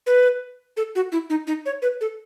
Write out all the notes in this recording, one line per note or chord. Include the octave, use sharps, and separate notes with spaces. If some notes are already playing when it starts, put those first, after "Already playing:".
B4
A4
F#4
E4
D#4
D#4
C#5
B4
A4